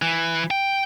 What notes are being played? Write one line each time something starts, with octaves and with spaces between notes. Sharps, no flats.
E3
G5